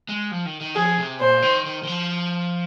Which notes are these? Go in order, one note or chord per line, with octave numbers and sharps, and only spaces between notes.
G#3
F3
D#3
D#3
F3 G#4
C3
A#2 C5
D#3
D#3
D#3
F3